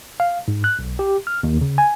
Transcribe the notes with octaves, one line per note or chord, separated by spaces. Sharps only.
F5
G#2
F#6
B1
G4
F6
D#2
C#3
G#5